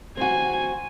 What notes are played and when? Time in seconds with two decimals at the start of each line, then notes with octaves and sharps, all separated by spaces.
0.17 C4 F#4 G#5